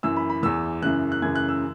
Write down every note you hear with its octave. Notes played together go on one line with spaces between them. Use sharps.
F#2 E3 E6
B5
B5
E2 E3 E6
F#2 C#3 E3 F#6
F#6
F#2 C#3 E3 G#6
F#6
E6